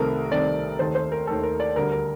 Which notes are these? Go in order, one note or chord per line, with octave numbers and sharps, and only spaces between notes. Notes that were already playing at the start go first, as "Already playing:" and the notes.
Already playing: C2 C3 D#3 A3 A#4
C2 C3 D#3 A3 D5
D#2 D#3 A3 C5
C5
A#4
D#2 D#3 A3 A4
A#4
D5
D2 D3 G3 A#4
A#4